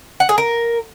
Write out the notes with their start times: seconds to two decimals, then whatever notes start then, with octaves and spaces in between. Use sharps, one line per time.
0.20 F#5
0.29 G#4
0.38 A#4